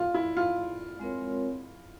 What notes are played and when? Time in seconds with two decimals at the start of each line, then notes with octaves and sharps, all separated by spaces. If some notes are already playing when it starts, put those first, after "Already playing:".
Already playing: F4
0.14 E4
0.37 F4
1.00 G#3 C4 F4 A#4 C#5